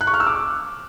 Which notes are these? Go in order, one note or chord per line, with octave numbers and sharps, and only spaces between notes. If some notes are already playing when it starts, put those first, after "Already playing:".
F#6
C#6
F6
E6
D6